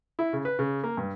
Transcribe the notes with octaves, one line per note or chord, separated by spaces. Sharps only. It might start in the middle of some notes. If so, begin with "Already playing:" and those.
E4
C#3
B4
C#3
A#3
G2